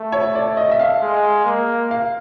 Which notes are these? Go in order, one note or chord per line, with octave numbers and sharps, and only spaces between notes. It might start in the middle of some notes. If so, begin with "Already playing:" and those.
Already playing: A3
C#5
D5
D#5
E5
F5
G#3
A#3
F5